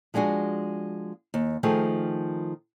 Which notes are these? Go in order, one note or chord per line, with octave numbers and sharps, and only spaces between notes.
F3 G#3 D4 F#4 G#4
D#2
D#3 F3 A3 G#4